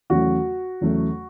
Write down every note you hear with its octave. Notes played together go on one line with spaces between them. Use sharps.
E2 C#3 F#3 A3 F#4
E2 C#3 F#3 A3